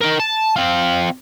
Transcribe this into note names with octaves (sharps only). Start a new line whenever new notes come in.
D#4 A#4
A5
C4 F4